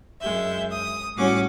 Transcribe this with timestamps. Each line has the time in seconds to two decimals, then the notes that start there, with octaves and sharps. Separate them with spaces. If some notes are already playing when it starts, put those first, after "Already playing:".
0.21 F#2 G#3 E5 G6
0.70 D#6
1.16 A2 G3 C#4 F#4 F#5 D6